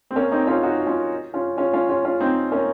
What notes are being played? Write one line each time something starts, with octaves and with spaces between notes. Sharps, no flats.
C4
A#3 C#4
C4 D#4
C#4 F4
D#4 F#4
C#4 F4
C#4 F4
C#4 F4
C#4 F4
C#4 F4
C#4 F4
C4 D#4
A#3 C#4